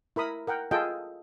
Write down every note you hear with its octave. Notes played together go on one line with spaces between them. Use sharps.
E4 A#4 B5 D#6
A#4 F#5 G5
F4 G#4 A4 D#5 G5